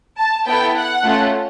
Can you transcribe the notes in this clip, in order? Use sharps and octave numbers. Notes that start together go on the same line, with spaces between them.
A5
B3 E4 A4 G5
F#5
A3 C#4 F4 A4